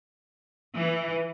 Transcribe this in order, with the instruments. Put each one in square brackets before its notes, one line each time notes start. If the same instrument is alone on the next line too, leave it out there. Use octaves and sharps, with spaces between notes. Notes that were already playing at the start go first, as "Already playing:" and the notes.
[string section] E3